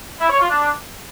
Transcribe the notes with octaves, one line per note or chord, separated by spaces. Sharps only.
E4
C#5
F4
D4